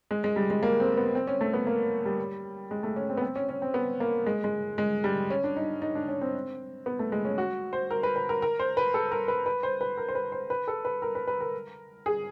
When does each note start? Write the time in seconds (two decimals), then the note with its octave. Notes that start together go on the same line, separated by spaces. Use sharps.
0.11 G#3
0.24 G#3
0.36 G3
0.50 G#3
0.63 A#3
0.80 C4
0.97 B3
1.15 C4
1.27 C#4
1.41 A3
1.54 B3
1.67 A#3
2.06 G3
2.71 G#3
2.83 A3
2.96 C#4
3.10 C4
3.17 B3
3.22 C4
3.36 C#4
3.49 C#4
3.62 C4
3.74 B3
4.00 A#3
4.26 G#3
4.44 G#3
4.78 G#3
5.04 G3
5.30 C#4
5.44 D4
5.56 D#4
5.82 D#4
5.95 D4
6.09 C#4
6.21 C4
6.86 B3
6.99 A3
7.12 G#3
7.25 C#4
7.38 F#4
7.73 C5
7.91 A#4
8.03 B4
8.16 B4
8.29 A#4
8.42 A#4
8.59 C5
8.77 B4
8.94 A4
9.12 A#4
9.28 B4
9.46 B4
9.63 C5
9.81 B4
9.98 A#4
10.08 C5
10.15 B4
10.32 C5
10.50 B4
10.68 A4
10.85 B4
11.02 A#4
11.15 B4
11.27 B4
11.40 A#4
12.06 G#4